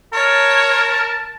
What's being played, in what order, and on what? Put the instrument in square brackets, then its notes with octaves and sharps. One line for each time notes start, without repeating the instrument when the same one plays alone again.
[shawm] A#4 [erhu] C#5 [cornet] A5